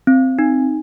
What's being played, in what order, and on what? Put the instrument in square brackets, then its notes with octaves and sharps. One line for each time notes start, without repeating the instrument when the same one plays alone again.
[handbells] C4
D#4